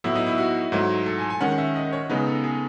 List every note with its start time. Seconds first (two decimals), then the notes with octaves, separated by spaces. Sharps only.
0.04 A2 F#3 B3 E4
0.15 D#4
0.26 E4
0.38 F#4
0.72 G#2 F#3 A3 D#4
1.06 A4
1.18 G#5
1.30 G#5
1.41 D#3 G#3 C#4 F#5
1.58 E5
1.76 D#5
1.92 C#5
2.10 C#3 G#3 B3 D#4 B4
2.27 A4
2.44 G#4